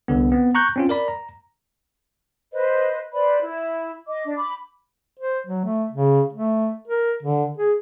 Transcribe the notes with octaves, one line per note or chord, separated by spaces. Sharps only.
C2 D3 B3
B3 C4
A#5 C#6 F#6 G6
C4 C#4 F4
A#4 D5 B5
A#5
B4 C5 D#5
B4 C5 D5 B5
E4
D#5 D6
D4
B5 D6
C5
F#3
A3
C#3
A3
A#4
D3
G#4